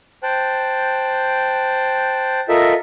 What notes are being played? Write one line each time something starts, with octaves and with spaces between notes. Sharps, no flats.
C5 G5 A5 F#6
F4 A4 A#4 D#5 E5